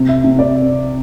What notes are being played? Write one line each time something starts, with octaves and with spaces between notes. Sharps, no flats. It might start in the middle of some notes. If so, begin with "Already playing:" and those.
Already playing: C3
E5
C3
D5